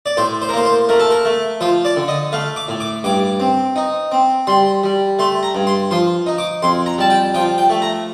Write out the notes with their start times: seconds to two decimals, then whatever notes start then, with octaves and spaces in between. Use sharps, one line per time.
0.06 D5
0.17 A2 C5
0.42 C5
0.49 A#4
0.53 A#3 C5
0.65 C5
0.89 A3 A#4
1.00 A4
1.10 A#4
1.25 A3
1.61 F3 C5
1.85 D5
1.97 D3
2.08 D#5
2.32 A3 F5
2.56 D6
2.68 A2
2.80 D6
3.04 G2 D6
3.40 C4
3.76 D#4
4.12 C4
4.47 G3 C6
4.84 G3
5.19 A3 C6
5.43 A#5
5.55 G2
5.67 C6
5.91 F3 C6
6.26 D#4
6.38 D6
6.62 F2 C6
6.86 A#5
6.98 G3 A5
7.10 G5
7.34 F3 G5
7.58 G5
7.70 A3
7.82 A#5